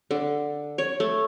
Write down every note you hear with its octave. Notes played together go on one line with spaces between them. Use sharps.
D3
C#5
A3